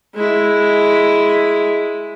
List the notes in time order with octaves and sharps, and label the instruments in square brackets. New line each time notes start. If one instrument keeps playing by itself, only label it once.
[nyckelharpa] G#3 E4